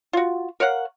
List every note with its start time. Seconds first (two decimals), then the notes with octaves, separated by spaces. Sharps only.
0.13 F4 F#4
0.60 A#4 C#5 F5 F#5